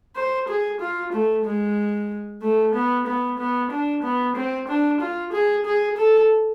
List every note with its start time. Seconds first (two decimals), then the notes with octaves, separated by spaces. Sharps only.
0.16 C5
0.49 G#4
0.81 F4
1.13 A3
1.46 G#3
2.42 A3
2.75 B3
3.07 B3
3.39 B3
3.72 D4
4.03 B3
4.36 C4
4.69 D4
5.01 F4
5.33 G#4
5.66 G#4
5.97 A4